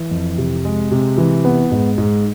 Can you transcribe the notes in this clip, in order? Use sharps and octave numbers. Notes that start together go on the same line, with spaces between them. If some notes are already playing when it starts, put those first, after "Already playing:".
Already playing: E3
F2
C3
G#3
C3
E3
B3
G#2
G#2